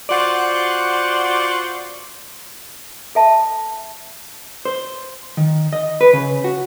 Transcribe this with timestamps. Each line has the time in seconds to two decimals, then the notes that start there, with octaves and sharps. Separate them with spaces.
0.10 F4 F#4 C5 D5 F#5
3.15 A4 E5 A5
4.65 C5
5.37 D#3
5.73 D#5
6.01 B4
6.13 C#3
6.44 F#4